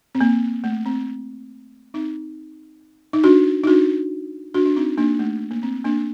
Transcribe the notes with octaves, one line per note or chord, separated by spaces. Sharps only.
C4
A#3
A3
C4
C4 D#4
D#4
D4 F#4
D#4
D4 F#4
D4 F#4
D4
C4 D#4
A#3 D4
A3
A#3
C4
A#3 D4